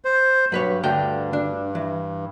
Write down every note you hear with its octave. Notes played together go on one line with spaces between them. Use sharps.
C5
G2 F#3 B4 C#5
D2 D3 G5
D4
E3